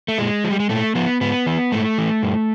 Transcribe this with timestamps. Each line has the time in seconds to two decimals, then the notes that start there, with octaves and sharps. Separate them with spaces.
0.08 A3
0.18 A#2 G#3
0.44 F3
0.50 G3
0.60 G#3
0.70 A#2 A3
0.95 F3 B3
1.21 G#2 B3
1.46 E3
1.72 G#2 A3
1.98 E3
2.23 G2